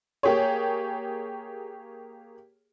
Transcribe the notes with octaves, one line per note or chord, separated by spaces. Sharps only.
A#3 G4 G#4 C#5